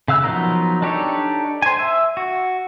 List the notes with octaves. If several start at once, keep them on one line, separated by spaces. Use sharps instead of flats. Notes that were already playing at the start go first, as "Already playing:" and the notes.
C#3 F5 E6 F#6
F3 F#3 B3 D#4 A#4
D4 D#4 G4 A4 C#5
C5 G#5
E5
F#4